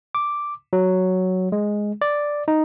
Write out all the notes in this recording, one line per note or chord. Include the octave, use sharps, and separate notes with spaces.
D6
F#3
G#3
D5
D#4